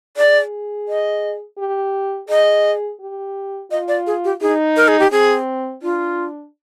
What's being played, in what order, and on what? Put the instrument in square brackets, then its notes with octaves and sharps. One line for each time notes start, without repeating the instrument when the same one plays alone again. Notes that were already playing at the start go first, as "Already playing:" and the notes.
[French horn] G#4 [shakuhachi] D5
[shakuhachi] D#5
[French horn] G4
[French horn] G#4 [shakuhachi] D#5
[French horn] G4
[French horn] F4 [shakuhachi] D#5
[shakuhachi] D5
G#4
G4
[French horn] D#4 [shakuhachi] G#4
[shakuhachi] A#4
G#4
G4
[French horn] C4 [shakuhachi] G#4
[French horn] D4 [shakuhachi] F4